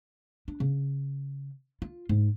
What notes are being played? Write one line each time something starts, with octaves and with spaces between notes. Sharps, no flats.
D4
C#3
F4
G#2